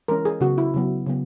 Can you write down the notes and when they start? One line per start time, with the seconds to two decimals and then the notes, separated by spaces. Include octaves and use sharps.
0.08 E3 G#3 C#4 A#4
0.25 G#4
0.41 C#3 F#3 B3 F#4
0.58 E4
0.74 C#3 F#3 B3
1.06 C#3 F#3 B3